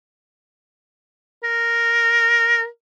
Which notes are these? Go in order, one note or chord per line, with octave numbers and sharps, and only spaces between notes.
A#4